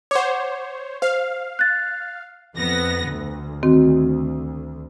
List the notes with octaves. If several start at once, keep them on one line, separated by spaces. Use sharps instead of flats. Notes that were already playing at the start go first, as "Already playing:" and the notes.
C5 C#5 F#5 D6
C5 F5
F#6 A6
F2 B3 A#6
D2
D#3 C4 F#4